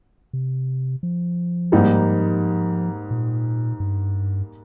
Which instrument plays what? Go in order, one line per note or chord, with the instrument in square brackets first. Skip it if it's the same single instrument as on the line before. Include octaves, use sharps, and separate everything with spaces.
[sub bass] C3
F3
[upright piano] G#2 G3 A#3 D#4
[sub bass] A#2
G2